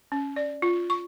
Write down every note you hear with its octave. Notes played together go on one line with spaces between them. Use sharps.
C#4
D5
F4
C#6